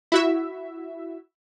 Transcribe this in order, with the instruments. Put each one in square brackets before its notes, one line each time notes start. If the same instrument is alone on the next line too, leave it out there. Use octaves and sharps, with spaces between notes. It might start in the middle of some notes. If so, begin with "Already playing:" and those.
[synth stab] E4 F#4 E5